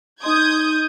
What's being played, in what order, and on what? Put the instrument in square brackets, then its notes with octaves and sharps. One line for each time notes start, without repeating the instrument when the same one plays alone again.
[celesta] D#4 D#5 C6 [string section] D#6 G6 G#6